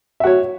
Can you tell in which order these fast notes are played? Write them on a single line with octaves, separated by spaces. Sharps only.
E5 F#4 C#5